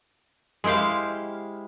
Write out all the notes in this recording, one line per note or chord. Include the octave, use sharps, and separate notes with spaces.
G#3 E4 G4 C5 F5